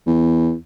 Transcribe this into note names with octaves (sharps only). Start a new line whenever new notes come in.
E2